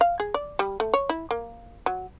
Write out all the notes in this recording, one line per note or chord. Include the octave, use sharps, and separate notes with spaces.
F5
G#4
D5
G3
A3
C#5
E4
A#3
F#3